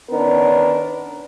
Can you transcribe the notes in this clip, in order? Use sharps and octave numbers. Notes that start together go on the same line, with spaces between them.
D#3 B3 C#4 D4 A#4